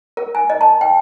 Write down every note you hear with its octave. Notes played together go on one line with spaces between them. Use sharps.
A#4
G#5
D#5
A5
G5